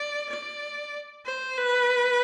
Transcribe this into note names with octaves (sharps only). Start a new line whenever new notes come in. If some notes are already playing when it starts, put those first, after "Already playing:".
Already playing: D5
D5
C5
B4